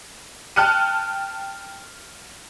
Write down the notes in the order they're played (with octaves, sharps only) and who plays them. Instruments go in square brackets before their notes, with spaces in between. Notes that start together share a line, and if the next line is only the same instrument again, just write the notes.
[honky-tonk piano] G5 A5 F6 F#6 C#7 D#7